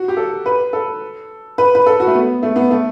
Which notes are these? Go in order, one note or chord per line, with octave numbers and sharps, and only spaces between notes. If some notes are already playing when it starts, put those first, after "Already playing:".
Already playing: F#4
G4
A4
B4
A4
B4
B4
A4
F#4
A3
B3
A3
B3
A3